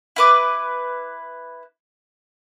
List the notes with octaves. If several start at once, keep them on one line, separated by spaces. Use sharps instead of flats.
E4 B4 D6